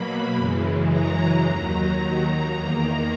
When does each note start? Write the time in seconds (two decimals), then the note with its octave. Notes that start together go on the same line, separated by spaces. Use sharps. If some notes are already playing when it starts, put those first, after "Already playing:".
Already playing: B2 F#3 A#3 B5
0.36 F#2 C#3 E3 G#3
0.90 A#5
1.44 D#2 D#3 F#3 A#5
2.54 E2 D#3 A#3